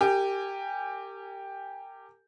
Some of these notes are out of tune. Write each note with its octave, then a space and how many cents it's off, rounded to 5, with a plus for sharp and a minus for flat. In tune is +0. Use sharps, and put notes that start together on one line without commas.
G4 +0 A#4 -35 G#5 -10